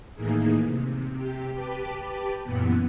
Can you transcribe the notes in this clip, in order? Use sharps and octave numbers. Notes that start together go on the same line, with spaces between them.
A2 D#3 E3 A#3 D#4 G#4
C3
C3 G4
G4 B4 G5 A5 D6
F#2 A#2 E3 B3